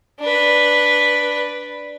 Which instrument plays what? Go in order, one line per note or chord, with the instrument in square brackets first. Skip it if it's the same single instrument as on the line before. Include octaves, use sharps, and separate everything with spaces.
[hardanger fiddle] D4 B4